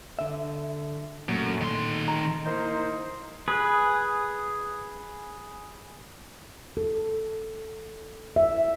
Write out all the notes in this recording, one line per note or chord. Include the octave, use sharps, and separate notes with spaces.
D3 E5
F#2 A#2 A3
D#3 C6
A#5
A#3 D#4 E4 C5
G#4 B4
A4
E5